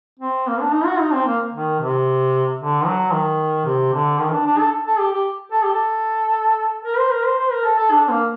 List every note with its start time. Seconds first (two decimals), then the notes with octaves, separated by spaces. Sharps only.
0.19 C4
0.47 A#3
0.60 D4
0.73 D#4
0.86 F#4
1.00 D#4
1.13 C4
1.26 A#3
1.53 D#3
1.80 C3
2.60 D3
2.86 F#3
3.13 D#3
3.65 C3
3.93 D3
4.19 D#3
4.32 D4
4.46 D4
4.59 A4
4.86 A4
4.99 G4
5.13 G4
5.52 A4
5.63 G4
5.74 A4
6.85 A#4
6.98 C5
7.11 A#4
7.25 C5
7.38 C5
7.51 A#4
7.64 A4
7.78 A4
7.91 D4
8.09 A#3